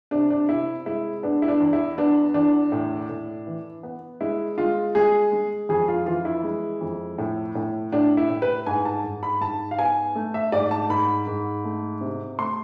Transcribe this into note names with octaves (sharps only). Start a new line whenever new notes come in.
C3 D4
D4
C3 E4
G#3 E4
B3 D4
E4
D4
E2
E4
B3 D4
E2 D4
A2
A2
E3
B3
G#3 E4
G#3 F4
G#3 G#4
G#3
F2 G#4
F4
E3 F4
E4
G#3
F2
A2
A2
A2 D4
E4
A2
B4
G#2 G#5
A5
G#2
B5
G#2 A5
F5
B3 G#5
A3
E5
G#2 D5
A5
G#2 B5
G#2
A3
C3
A3 C6